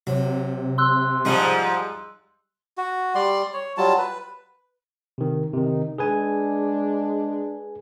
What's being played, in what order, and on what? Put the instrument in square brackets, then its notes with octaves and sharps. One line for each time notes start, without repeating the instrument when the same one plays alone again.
[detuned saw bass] C3 [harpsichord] F#3
[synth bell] C6 E6 F#6
[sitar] G#2 F3 [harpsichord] G3 D#4 G#4
[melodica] F#4
G3 D5 C6
C#5
F#3 G3 F4 A5
B4
[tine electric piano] C3 D#3
[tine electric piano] C3 D#3 [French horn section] D#4
[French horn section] G#3 D4 [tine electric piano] G#4 B4 G#5